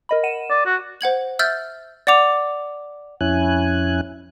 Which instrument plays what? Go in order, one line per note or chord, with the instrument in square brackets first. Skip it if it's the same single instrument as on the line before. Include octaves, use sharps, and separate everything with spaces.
[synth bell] A#4 D#5 B5
F#5 D#7 E7
[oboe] D5
F#4
[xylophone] C5 F#5 G#6 F#7
E5 E6 F6 G6 A6
D5 F#5 D6 F7
[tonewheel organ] F2 C#4 E4 G#5 F#6